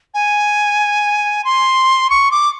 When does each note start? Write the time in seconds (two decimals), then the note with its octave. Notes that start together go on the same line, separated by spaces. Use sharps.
0.14 G#5
1.45 C6
2.10 C#6
2.31 D6